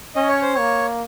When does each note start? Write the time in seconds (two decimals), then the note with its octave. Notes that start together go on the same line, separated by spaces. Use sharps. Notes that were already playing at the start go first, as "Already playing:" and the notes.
0.16 C#4 D#5
0.28 C#5
0.42 C5
0.54 A#3 C#5